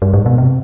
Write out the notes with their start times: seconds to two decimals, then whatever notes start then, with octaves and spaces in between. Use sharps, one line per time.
0.02 G2
0.13 G#2
0.26 B2
0.38 C3